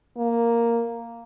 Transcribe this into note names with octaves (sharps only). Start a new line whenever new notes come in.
A#3